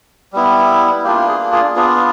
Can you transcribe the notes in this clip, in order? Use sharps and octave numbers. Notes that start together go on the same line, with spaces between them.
G3 B3 E4
A#3 D4 F4 G4
G#4
G#4
B3 D4 F4 G#4